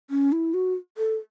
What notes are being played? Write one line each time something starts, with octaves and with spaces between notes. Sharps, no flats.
C#4
E4
F#4
A4